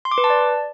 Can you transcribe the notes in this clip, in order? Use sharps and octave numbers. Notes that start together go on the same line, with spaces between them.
C6
D6
B4
A5
D5